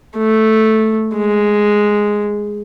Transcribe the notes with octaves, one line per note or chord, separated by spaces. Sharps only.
A3
G#3